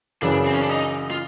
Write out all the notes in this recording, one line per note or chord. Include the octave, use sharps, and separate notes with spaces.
F#2 C#3 E3 D4
C4
C#4
D4
D#4
F4